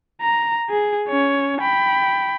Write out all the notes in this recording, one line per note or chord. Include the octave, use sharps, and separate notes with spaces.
A#5
G#4
C#4 C#5
G5 B5